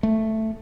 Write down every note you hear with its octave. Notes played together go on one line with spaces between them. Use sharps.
A3